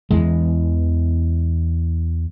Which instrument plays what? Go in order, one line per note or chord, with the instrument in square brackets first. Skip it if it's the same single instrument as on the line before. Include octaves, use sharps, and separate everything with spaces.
[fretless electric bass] E2 E3 G#3